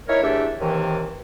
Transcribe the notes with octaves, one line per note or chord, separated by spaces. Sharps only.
D#4 E4 A#4 C#5
E2 A3 D4 G4 E5
D#2 C3 D#3 E3